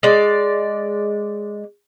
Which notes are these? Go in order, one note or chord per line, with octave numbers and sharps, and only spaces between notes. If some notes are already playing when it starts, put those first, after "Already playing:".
G#3 D5